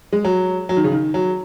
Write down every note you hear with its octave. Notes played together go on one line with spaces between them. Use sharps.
G#3
F#3
F#3
D#3
C#3
D#3
F#3